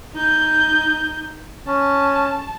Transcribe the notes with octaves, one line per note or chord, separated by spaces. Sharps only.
D#4 G6
C#4 A5